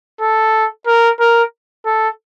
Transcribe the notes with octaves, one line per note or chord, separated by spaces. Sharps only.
A4
A#4
A#4
A4